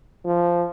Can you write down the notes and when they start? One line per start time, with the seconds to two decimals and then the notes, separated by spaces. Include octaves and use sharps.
0.25 F3